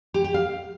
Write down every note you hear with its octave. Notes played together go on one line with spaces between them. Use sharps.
G4
G4
F5